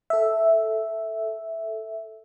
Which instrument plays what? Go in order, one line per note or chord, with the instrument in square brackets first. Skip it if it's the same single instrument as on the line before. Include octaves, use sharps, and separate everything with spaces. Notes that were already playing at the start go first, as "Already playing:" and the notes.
[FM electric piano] A4 E5